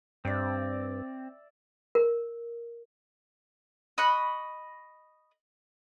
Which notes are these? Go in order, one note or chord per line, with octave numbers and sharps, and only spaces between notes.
G2 C4 D5 E5
A#4
D#5 B5 C#6 F#6